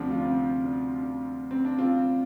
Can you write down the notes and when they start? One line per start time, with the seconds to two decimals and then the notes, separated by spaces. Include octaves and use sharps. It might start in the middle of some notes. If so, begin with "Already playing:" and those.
Already playing: D2 C3 F3 D4
0.10 F4
0.17 D4
0.25 C4
0.64 D4
1.01 D4
1.51 C4
1.65 D4
1.79 C4 F4